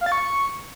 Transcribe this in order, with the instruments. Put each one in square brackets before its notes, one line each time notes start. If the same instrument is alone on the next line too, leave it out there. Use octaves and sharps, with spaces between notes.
[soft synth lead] F5
A6
C#6